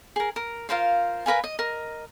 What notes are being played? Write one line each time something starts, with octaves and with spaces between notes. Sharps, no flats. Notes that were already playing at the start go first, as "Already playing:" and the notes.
G#4 A#4
A#4
F4 A#4 C5 F5
A#4 B4 F5 G#5
D#5
A#4 D#5